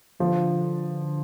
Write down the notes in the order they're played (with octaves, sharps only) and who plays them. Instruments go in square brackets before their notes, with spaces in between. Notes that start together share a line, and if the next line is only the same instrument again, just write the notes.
[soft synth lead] D3 [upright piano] F3